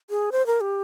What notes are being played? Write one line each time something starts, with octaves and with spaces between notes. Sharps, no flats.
G#4
C5
A#4
G4